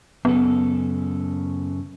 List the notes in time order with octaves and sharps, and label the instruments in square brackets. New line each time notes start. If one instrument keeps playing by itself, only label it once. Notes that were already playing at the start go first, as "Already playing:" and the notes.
[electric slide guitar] F#2 C#3 A4 [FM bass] B3